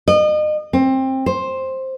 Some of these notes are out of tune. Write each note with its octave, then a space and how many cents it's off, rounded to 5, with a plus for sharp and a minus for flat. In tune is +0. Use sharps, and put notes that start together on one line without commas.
D#5 -35
C4 +20
C5 +10